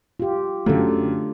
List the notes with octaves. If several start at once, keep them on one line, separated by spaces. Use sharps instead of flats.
F4 G4
F#2 D3 A3 F4 G4 A4